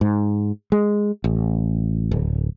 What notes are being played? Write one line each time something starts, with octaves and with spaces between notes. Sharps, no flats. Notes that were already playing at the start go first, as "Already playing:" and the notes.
G#2
G#3
A1
D1